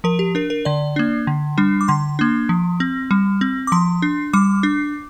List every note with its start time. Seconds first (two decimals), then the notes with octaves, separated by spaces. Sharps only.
0.04 F3 A#4
0.19 G4
0.35 D4 A#4
0.50 A#4
0.65 D3 D5
0.96 A#3 D4
1.27 D3
1.58 G3 D4
1.81 D6
1.88 D3 C6
2.19 A#3 D4
2.49 F3
2.80 C4
3.11 G3
3.41 C4
3.67 D6
3.72 F3 C6
4.02 D4
4.33 G3 D6
4.63 D4